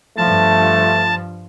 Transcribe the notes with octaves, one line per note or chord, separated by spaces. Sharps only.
G2 F3 A3 A5